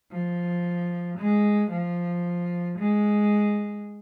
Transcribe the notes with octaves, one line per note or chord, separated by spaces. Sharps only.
F3
G#3
F3
G#3